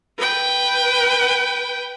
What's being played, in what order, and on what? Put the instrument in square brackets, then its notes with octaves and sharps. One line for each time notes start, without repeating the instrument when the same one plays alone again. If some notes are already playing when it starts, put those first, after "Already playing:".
[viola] B4 G5